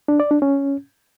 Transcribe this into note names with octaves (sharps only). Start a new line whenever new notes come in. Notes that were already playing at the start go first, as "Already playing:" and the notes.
D4
D5
D4
C#4